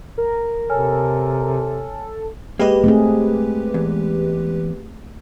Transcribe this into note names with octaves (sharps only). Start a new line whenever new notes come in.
A#4
C3 A4 C#5 G#5 F6
G#3 A#3 G4 B4 D#5
A3 C4 G#4
E2